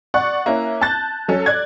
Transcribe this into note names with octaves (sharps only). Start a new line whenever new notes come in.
D5 F#5 C#6 F#6
A#3 C#4 E4
A5 F#6 G6 A6
F#3 C#4 A4
D5 F#6 G#6